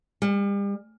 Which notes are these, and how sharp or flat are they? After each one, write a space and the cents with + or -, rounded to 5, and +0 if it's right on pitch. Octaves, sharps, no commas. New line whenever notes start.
G3 +40